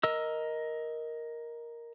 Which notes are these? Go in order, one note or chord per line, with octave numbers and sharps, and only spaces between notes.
A#4 D#5 E6